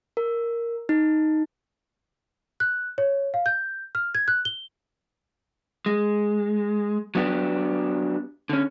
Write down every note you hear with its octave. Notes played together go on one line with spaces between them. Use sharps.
A#4
D#4
F#6
C#5
F5
G6
F6
G#6
F#6
G7
G#3
F#3 B3 D4 G4
D3 C#4